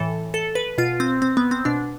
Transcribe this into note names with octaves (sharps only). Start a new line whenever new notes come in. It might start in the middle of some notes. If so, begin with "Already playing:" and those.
Already playing: A2 E3 A4
A4
B4
B2 F4
C4
C4
B3
C4
B2 D4